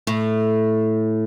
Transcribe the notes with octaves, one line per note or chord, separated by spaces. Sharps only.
A2